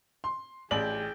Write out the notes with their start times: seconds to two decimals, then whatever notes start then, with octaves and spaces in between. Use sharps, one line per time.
0.24 C6
0.71 A1 G#4 D5 G5 F#7